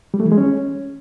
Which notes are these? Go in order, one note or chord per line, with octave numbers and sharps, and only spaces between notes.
G3
A3
E3
G#3
C#4